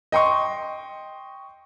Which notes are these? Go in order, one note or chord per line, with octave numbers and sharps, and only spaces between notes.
D#5 G5 C6 C#6